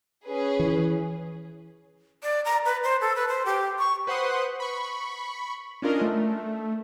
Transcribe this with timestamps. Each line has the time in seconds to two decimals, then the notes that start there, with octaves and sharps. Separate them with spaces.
0.25 C#4 G#4 B4
0.59 E3
2.23 D5
2.45 A#5
2.65 B4
2.83 C5
3.01 A4
3.16 B4
3.28 C5
3.45 G4
3.79 C#6
4.07 B4 C5 F#5 C6 D#6 F#6
4.60 B5 C#6
5.82 C#4 D4 F4 A#4 D#5
6.02 A3